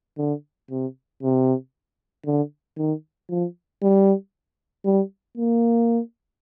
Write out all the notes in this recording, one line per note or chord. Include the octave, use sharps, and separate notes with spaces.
D3
C3
C3
D3
D#3
F3
G3
G3
A#3